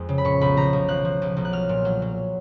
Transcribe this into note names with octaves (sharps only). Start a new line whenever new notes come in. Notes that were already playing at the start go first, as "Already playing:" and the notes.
Already playing: F2 G#3
C#3
B5
A#2 C#6
B1 B5
F3 A#5
B1
F3 F#6
F3
B1
B1
F#6
F#3 F6
A#2
F#3
F#3